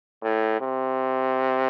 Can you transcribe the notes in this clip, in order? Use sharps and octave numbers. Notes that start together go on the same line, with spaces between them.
A2
C3